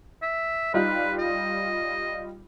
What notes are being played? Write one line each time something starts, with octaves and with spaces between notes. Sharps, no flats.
E5
G3 D#4 F4 B4
D#5